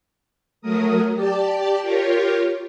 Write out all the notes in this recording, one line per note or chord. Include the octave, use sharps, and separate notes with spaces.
F#3 A3 A#4 D#6
G4 D5 A5
F4 G4 A#4 C#5